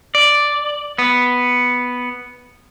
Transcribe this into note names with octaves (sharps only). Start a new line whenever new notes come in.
D5
B3